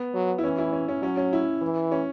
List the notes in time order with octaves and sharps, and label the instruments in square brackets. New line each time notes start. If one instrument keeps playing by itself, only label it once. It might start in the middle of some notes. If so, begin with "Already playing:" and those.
Already playing: [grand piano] B3
[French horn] F#3
[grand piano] E4
[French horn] E3 [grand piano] C#4
[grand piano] E4
C#4
C#4
[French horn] F#3 [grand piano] C#4
[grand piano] C#4
E4
[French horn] E3
[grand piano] C#4